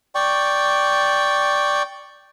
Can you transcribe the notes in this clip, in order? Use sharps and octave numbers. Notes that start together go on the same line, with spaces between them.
D5 G5 C#6